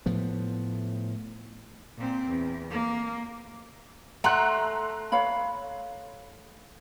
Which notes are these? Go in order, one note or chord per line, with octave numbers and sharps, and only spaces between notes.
A2 F3 B3
A#2 C4
E2
A#3
A3 F#5 A#5 C6 F#6
C#5 F5 B5